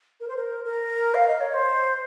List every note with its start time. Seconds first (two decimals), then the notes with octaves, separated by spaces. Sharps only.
0.20 A#4
0.28 C5
0.36 A#4
0.65 A#4
1.14 F5
1.27 D#5
1.40 C#5
1.54 C5